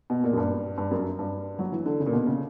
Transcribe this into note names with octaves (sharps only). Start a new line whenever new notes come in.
B2
A#2
F#2
G2
G2
F#2
G2
F#3
E3
D3
C#3
A#2
B2
C#3